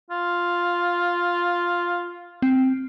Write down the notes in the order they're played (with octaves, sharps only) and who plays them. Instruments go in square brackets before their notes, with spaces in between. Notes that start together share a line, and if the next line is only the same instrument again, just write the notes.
[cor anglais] F4
[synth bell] C4